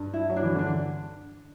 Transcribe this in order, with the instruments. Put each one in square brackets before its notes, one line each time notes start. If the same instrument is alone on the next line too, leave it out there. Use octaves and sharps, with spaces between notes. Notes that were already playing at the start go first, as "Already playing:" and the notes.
Already playing: [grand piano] G2
[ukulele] E4
[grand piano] F#3
[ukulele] D4
[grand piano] E3
[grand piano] D3 [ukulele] D4